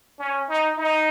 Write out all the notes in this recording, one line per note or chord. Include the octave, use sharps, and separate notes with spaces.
C#4
D#4
D#4